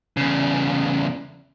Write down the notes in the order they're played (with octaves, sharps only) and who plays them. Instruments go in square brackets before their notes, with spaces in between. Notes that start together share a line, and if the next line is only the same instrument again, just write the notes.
[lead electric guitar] E2 C#3